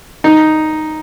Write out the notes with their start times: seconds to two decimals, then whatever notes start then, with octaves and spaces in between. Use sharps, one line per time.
0.24 D#4